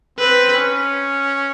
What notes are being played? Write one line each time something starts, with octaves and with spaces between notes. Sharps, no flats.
C4 B4
C#4